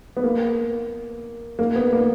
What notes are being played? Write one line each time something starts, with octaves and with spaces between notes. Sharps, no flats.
B3
A#3
A#3
B3
A#3